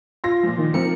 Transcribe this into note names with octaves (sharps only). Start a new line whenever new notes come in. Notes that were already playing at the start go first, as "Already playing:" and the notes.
F4 C6 A#6
A#2 F3
D#3
F3 C4 A#4 C#7